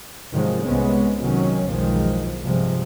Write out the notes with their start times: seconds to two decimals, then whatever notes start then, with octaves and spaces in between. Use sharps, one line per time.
0.31 G#2 C3 D#3 F3 F#3 G#3
0.63 C2 C3 G#3 B3 C#4
1.18 C3 D#3 F#3 C#4
1.67 B1 E2 D#3 F3 G#3
2.42 G2 C3 F3 G#3